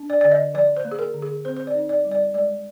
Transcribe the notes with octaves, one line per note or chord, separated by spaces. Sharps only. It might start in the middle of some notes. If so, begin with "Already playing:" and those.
Already playing: D4
D5
D3 D5
D#5
F3 D5
C5
A#3
G#4
A#4
D3
G#4
C4 C5
C5
D5
D#4
D5
G3
D5
G#3 D5